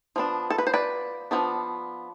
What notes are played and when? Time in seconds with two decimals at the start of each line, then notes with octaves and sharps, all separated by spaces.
0.16 F3 B3 D4
0.50 A4
0.58 B4
0.67 C5
0.73 B4 D5
1.31 F3 B3 D4